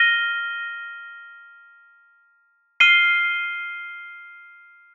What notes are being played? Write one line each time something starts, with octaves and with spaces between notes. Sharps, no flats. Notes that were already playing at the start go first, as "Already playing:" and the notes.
Already playing: F6 A#6 D#7 G7
F6 C7 D#7 G7